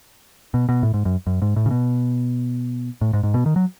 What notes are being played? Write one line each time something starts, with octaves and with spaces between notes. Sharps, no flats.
B2
B2
A2
G#2
F#2
F#2
G#2
A2
C#3
B2
A2
G#2
G#2
B2
D#3
F#3